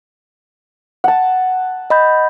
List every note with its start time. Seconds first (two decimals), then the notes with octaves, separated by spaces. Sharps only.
1.04 F#5 A5
1.90 D#5 B5 G6